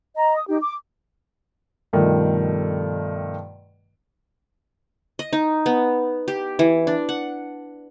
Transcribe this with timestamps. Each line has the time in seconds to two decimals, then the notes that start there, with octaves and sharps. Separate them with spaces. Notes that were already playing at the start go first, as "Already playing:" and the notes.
0.15 D#5 A#5
0.36 D#6
0.48 D#4 G4
0.61 D6
1.93 G2 B2 D#3 F3 G3 A3
5.19 D#5
5.33 D#4
5.66 B3
6.28 G4
6.59 E3
6.87 D4
7.09 F#5